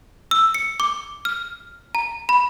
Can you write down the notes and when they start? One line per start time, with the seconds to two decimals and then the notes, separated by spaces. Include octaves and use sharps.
0.31 E6
0.55 C#7
0.80 D6
1.25 F6
1.95 A#5
2.29 B5